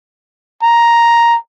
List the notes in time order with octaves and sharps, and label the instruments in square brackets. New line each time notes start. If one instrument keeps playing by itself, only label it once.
[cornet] A#5